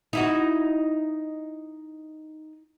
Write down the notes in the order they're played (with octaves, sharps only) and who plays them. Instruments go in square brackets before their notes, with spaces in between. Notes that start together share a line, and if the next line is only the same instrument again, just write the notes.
[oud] D#4 E4 F#4